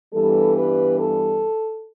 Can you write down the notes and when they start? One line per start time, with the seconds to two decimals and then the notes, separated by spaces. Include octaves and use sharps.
0.12 G2 E3 G3 B3 A4
0.55 B4
0.97 A4